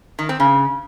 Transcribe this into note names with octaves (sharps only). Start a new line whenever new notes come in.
D#3
C4
C#3